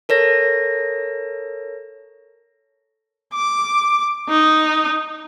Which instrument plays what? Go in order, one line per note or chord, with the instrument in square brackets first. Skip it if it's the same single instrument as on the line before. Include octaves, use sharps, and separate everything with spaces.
[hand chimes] A4 A#4 C#5 A#6
[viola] D6
D#4